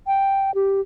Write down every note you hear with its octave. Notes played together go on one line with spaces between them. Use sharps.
G5
G4